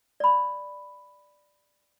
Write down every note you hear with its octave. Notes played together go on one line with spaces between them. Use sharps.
D5 B5